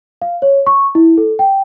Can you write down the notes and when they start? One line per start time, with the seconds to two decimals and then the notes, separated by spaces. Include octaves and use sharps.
0.22 F5
0.42 C#5
0.67 C#6
0.95 E4
1.17 A4
1.39 G5